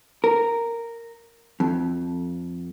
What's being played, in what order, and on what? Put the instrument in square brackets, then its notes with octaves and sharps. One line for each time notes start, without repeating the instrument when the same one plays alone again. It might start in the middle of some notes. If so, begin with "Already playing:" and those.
[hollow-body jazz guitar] A#4
F2